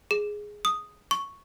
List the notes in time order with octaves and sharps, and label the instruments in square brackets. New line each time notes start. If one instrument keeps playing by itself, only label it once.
[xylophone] G#4
D#6
C#6